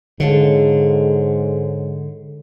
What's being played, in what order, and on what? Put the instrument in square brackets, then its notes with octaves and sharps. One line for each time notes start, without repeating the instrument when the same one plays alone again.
[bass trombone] G#2 [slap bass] D3 [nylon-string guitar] A3 F4 A4 [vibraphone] G#4 C#5